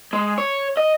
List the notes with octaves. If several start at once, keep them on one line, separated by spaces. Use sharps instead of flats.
G#3
C#5
D#5